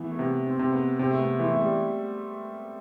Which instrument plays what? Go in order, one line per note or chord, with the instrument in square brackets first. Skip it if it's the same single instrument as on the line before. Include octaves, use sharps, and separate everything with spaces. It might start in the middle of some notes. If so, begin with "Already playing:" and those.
Already playing: [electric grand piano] E3 [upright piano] A3 B3
[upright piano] A3
[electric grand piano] C3 [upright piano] B3
[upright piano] C4
[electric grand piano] C3 [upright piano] C4
[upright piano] B3
[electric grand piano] C3 [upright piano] C4
[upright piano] A3
B3
[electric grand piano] E3 [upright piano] A3
[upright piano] A3
G3